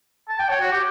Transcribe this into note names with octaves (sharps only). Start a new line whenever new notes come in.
A5
G5
C#5
F#4
G4